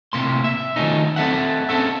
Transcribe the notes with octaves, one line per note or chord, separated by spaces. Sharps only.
A2 C3 A#3 C6
E5
D#3 F3 F#3 A3 C#4 D#4
C4 A4 E5 F#5
C4 C#4 A4 E5